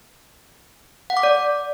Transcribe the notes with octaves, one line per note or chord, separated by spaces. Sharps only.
F#5
D6
D5